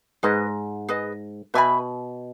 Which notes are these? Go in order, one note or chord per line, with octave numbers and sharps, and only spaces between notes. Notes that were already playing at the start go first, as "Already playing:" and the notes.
G#2 G#4 B4 D#5
G#4 B4 D#5
B2 B4 E5 G#5 B5